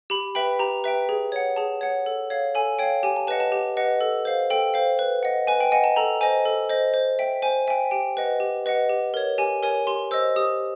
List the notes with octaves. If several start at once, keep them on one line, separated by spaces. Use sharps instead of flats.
G4 B5
B4 E5 G5 B5
G4 A#5
B4 E5 G5
G#4
C#5 F#5
G#4 A5
C#5 F#5
A4
C#5 F5
A4 G#5
C#5 F5 G5
G4 G#5
A5
B4 D#5 F#5 A5
A5
G4
B4 D#5 F#5
A4
C5 F5
A4 G5
C5 F5
B4
D#5 F#5
B4 G#5
G5
D#5 F#5 G#5
A5
A4 A#5
C5 D#5 G#5
A4
C5 D#5
C5
E5 G5
C5 G#5
E5 G5 G#5
G4 G5
B4 D#5 F#5
G4
B4 D#5 F#5
G4
A#4 C#5
G4 G#5
A#4 C#5 G#5
G4 C6
C5 D#5 E6
G4 D#6